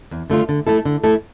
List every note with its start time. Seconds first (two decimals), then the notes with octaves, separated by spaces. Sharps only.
0.11 E2
0.30 D3 A3 D4 F4
0.49 D3
0.67 A3 E4 A4
0.85 D3
1.04 A3 E4 A4